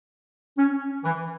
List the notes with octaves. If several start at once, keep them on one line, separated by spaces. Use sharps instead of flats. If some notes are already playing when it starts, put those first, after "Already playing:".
C#4
E3